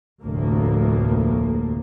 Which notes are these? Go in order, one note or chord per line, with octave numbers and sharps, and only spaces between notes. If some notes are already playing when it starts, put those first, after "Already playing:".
F1 D2 A2 A#3